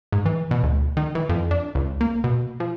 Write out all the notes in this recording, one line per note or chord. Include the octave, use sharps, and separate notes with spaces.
G#2
E3
B2
D2
D#3
E3
F2
D4
C#2
A#3
B2
F3